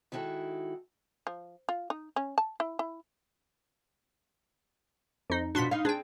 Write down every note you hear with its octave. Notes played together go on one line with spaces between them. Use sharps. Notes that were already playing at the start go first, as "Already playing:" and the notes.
D#3 G#3 E4 F#4 A4
F3
F4
D#4
C#4
A5
E4
E4
F2 D#4
B2 F3 D4 F#4 C6 B6
D#4 F5
C4 D4 G#4 G5